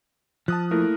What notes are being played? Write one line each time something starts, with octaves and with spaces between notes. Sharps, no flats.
F3 A5 D#6 F#6
A3 A#3 E4 A#4